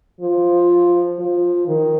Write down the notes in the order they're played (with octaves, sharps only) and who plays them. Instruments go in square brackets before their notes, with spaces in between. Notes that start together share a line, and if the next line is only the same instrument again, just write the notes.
[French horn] F3
F3
D#3